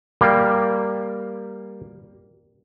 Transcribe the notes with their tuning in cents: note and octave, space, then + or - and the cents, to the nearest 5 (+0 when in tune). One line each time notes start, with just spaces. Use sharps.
G3 +0 A#3 +0